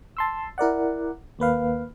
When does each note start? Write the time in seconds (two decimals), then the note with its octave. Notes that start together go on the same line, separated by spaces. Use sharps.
0.17 A5 C6 E6
0.58 E4 A#4 D5 F#5
1.39 D#2 A#3 B4 F5